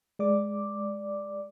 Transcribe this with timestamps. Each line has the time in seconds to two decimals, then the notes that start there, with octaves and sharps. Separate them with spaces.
0.19 G#3 D5 D6